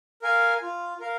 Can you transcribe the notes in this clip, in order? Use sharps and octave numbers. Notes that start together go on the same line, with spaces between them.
A#4 F5 G#5
F4
A#4 F5